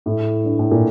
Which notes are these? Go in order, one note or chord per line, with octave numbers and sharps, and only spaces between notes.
A2
G2
A2
A#2